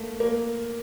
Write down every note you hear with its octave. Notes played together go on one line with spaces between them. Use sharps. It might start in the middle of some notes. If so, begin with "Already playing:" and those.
Already playing: A3 A#3
A#3